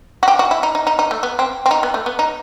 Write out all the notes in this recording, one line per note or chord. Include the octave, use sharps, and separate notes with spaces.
F#4
G4
F#4
E4
D#4
D#4
D#4
D#4
A3
B3
C4
C4
D#4
B3
A3
B3
D#4